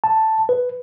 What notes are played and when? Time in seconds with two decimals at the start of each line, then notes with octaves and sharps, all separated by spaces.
0.04 A5
0.49 B4